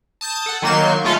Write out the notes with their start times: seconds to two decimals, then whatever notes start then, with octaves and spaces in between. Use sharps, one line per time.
0.21 A5 D#6 G6 A6
0.46 A4 F#5
0.62 D#3 F#3 A#3 C6 C#6 G6
1.04 G#3 A3 F4 A4 D#5 F5